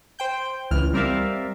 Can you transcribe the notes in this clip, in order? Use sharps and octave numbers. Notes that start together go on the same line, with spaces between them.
C5 G5 G6
C#2 E3 F6
G3 C4 A#4 D5 E5 F5